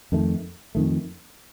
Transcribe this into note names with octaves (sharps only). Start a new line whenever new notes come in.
F2 D#3 A3
F2 D#3 A3